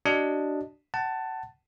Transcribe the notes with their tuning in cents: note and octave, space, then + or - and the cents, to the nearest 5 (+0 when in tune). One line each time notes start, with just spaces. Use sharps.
D4 +0 F#4 +35 D#5 +0
F#5 +30 A5 +10